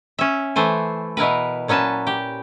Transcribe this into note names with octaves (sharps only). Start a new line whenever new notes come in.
C#4 E5
E3 A3 C5 G#5
B2 E4 A#4 B4
A#2 F#3 C#4 B4 A5
G4